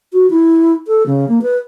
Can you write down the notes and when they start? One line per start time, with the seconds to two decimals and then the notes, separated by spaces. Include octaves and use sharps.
0.13 F#4
0.30 E4
0.87 A4
1.06 C#3
1.28 A#3
1.42 B4